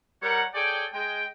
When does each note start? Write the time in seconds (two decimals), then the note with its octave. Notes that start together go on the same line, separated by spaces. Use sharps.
0.23 G3 A#4 C#5 F#5
0.54 G#4 A4 C#5 D5 G5
0.93 G#3 G5